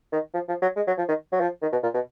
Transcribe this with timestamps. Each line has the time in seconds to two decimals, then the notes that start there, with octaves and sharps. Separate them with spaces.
0.12 D#3
0.34 F3
0.48 F3
0.62 F#3
0.76 G#3
0.87 F#3
0.98 F3
1.09 D#3
1.32 F#3
1.41 F3
1.62 D#3
1.72 B2
1.83 A#2
1.94 B2